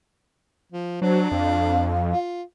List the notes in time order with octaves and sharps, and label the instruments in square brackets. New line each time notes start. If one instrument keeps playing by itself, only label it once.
[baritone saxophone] F3
[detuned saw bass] F#3 [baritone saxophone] D4 [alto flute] C5
[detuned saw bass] F2 [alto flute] F5
[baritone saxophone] F4